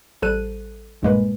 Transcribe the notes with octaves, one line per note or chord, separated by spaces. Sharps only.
A1 G3 A4 C5 F#6 D#7
B1 G2 A#2 G#3 A#3 B4